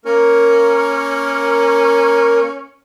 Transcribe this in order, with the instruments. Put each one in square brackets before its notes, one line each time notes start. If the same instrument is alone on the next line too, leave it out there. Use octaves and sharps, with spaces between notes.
[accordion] A#3 A#4 [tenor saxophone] C#4